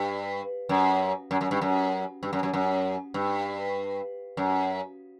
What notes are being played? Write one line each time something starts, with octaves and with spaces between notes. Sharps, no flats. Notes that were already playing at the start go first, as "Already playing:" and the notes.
Already playing: G2
F#2
F#2
F#2
G2
F#2
G2
F#2
F#2
F#2
G2
F#2